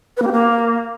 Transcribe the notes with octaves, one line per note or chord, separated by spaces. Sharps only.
B4
A#3
G4
A#3